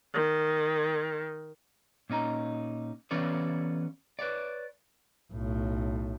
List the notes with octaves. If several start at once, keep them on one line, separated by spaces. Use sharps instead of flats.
D#3
A#2 C#4 D#4 A#5
E3 B3 C#4 B4 C#5 D5
B4 C#5 D5
B1 A2